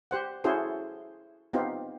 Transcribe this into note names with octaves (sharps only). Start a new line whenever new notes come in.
G4 C5 F#5
C#4 E4 F#4 G#4 A4 C5
B3 C4 D#4 F4 G4